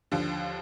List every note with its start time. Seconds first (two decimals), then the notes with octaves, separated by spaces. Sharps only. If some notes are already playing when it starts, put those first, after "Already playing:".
0.12 D#2 D3 F3